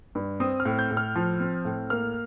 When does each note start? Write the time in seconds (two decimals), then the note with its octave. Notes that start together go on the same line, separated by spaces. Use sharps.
0.15 G2
0.40 C4 D#6
0.60 F6
0.65 A2
0.79 G6
0.91 A2
0.97 F6
1.15 F3
1.40 C4
1.65 A2
1.90 A#3 F6